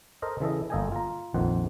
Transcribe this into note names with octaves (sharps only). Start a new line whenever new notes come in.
A4 A#4 C5 D#5
C#3 E3 A4 D#5
G1 A#3 A4 D#5 G5 G#5
F4 A#5
A#1 F2 D#3 C5 F#5